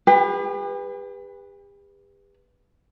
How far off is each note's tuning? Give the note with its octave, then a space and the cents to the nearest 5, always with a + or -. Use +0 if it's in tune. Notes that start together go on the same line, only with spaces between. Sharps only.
G4 +45 B4 -5